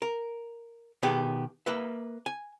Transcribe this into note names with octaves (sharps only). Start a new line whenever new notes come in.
A#4
B2 D#3 B3 G4 G#4
A#3 B4 E5
G#5